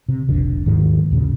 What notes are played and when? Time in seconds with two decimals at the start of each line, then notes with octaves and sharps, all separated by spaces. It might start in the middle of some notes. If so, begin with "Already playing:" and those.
0.09 C3
0.28 E1 A#1 D3
0.66 D#2 G#2 D#3 F3
1.11 D#2 A#2 C#3